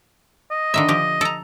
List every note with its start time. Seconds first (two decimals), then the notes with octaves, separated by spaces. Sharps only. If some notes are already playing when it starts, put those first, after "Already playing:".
0.51 D#5
0.74 D3 D#3 E5
0.89 F3 G4
1.21 A4 A#5